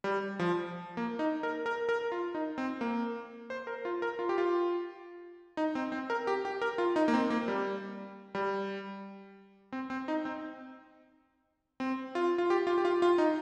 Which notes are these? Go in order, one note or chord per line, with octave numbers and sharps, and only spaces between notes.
G3
F3
A#3
D#4
A#4
A#4
A#4
F4
D#4
C4
A#3
C5
A#4
F4
A#4
F4
G4
F4
D#4
C4
C4
A#4
G4
G4
A#4
F4
D#4
A#3
C4
A#3
G3
G3
C4
C4
D#4
C4
C4
F4
F4
G4
F4
G4
F4
F4
D#4